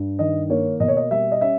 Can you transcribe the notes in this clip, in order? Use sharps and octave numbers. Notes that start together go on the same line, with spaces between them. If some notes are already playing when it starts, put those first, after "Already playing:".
Already playing: G2
D#3 D#5
A#3 C#5
B2 D#5
C#5
D#5
G3 E5
D#5
C#4 E5